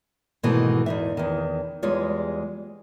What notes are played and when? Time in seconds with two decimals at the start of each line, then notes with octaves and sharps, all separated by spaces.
0.43 G#2 B2 D#3 E3 A3
0.86 E2 D#4 E5
1.17 E2 D#3
1.83 E2 G3 G#3 F4 C#5